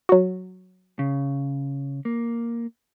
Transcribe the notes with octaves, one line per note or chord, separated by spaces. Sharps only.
F#3 F#4
C#3
A#3